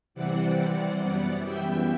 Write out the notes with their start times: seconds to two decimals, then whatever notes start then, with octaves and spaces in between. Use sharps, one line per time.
0.14 C3 E3 G3 C4 D5 F#5
1.01 F#2 E3 G3 B3
1.44 E5 G5